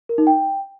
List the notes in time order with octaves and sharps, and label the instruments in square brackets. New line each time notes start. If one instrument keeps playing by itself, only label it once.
[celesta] A#4
D#4
G5